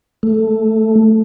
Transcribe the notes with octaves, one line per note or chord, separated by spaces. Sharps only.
A3